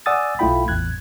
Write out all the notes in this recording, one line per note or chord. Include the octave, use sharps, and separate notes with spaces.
D5 F#5 G#5 D#6 E6 A6
B1 A3 E4 F4 G5 B5
A1 E2 F#6 G#6